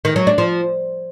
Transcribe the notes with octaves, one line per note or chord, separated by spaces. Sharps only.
D#3
F#3
D4
F3